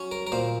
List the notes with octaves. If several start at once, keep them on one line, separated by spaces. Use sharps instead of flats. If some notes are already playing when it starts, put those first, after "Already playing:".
Already playing: F#3 C#4
A#4
A#4
A#2 C5